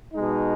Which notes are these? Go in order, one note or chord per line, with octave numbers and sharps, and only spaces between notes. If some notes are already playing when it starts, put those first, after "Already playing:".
B2 G#3 D#4